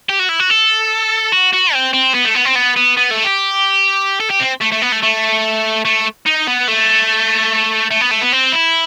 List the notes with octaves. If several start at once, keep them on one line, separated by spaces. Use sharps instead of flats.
G4
F#4
E4
F#4
A4
F#4
F#4
C4
C4
B3
A3
B3
C4
B3
B3
B3
A3
G4
A4
G4
C4
A3
A3
B3
A3
A3
A3
D#4
B3
A3
A3
B3
A3
B3
C4
E4